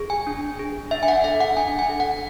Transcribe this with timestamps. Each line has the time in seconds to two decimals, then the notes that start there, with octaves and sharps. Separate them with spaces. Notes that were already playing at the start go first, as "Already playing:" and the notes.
Already playing: G#4
0.10 G#5
0.27 D4
0.59 G#4
0.91 D4 E5
1.03 G#5
1.08 F#5
1.24 A4 E5
1.40 F#5
1.57 D4 G#5
1.79 G#5
1.89 A4
2.00 F#5